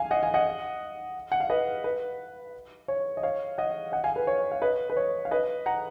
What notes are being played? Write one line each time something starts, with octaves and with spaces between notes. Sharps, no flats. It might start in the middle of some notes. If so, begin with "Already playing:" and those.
Already playing: F5 G#5
D#5 F#5
F5 G#5
D#5 F#5
F#5
F5
B4 D#5
B4
C#5
D#5
C#5 F5
D#5 F#5
D#5 F#5
F5 G#5
B4
C#5
F5
B4 D#5
B4
C#5
F5
B4 D#5
F#5 A#5